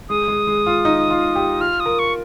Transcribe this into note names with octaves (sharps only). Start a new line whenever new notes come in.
G#3 D#6
G#3
G#3
F4
D#4
F4
G4
F4 F6
D#6
A#4
C#6